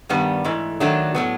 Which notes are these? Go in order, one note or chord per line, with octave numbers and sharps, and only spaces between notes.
G2 D#3 G3 B3
G#2 E3 A3
D#3 F#3 A3 D4
A2 F#3 B3